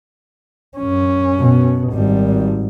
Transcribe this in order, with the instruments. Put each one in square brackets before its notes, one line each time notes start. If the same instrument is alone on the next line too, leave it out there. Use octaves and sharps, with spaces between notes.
[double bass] F#2 C#4
[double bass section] B2
[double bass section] G#1 [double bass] G3